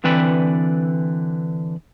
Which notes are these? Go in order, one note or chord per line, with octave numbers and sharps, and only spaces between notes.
D3 E3 C4 B4 D5 B5